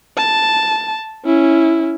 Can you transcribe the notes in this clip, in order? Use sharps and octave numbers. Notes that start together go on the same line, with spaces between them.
A5
C#4 E4